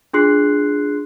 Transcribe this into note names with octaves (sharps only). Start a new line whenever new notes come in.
D4 F4 G#4 C6 F#6 C7